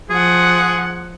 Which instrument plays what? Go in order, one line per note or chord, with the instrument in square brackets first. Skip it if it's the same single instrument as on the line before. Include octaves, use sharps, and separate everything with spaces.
[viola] F3 F#5 [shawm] G#4